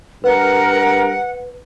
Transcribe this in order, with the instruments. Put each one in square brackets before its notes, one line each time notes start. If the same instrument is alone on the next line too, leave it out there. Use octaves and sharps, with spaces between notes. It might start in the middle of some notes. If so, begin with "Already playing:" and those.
[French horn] G2 [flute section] A#4 [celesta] B4 [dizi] F#5